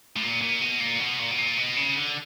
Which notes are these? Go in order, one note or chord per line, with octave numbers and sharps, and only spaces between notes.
A2
A#2
A#2
B2
A#2
B2
A#2
B2
A#2
B2
C#3
D3